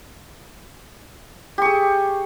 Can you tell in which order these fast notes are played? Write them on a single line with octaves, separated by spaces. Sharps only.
G4 C#6 G#4